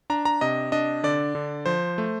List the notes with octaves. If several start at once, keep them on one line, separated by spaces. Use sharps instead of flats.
D4 A#5
A#5
C3 D#5
D4 D#5
D3 D5
D3
F3 C5
A3